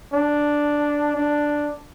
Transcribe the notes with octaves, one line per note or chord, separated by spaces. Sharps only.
D4
D4